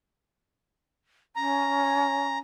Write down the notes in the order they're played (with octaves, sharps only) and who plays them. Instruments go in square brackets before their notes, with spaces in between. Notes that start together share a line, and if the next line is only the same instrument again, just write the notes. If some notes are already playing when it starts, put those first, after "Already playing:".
[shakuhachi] C#4 [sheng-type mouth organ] A#5